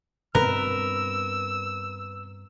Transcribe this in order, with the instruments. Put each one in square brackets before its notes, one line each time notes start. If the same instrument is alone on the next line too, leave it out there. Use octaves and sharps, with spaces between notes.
[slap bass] G2 B2 C4 [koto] A#4 [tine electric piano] B4 [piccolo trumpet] E6